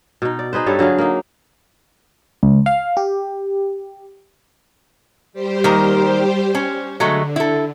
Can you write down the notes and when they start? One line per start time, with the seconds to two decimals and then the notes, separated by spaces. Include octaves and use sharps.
0.22 B2 D#4
0.39 D5
0.53 D#4 G#4 B4 C5
0.66 G2 G3 A4 C#5
0.79 D3 F#3 G#4 F5
0.98 A#3 D#4
2.43 C#2
2.66 F5
2.97 G4
5.33 G3 G4 C5
5.64 D#3 A#3 A#4
6.55 C#4
7.00 D3 F#3 G#3 A3
7.36 E4 A4